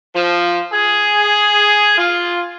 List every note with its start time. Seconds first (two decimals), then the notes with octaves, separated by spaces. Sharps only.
0.15 F3
0.73 G#4
1.98 F4